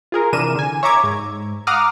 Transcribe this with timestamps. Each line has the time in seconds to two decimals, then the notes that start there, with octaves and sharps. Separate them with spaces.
0.12 F4 G#4 A#4
0.33 C3 E3 D4 A#4 D#7 E7
0.55 D3 G#5
0.83 C#5 E5 A#5 D6 G#6
1.03 G#2
1.67 F5 F#5 A#5 D6 D#6 F6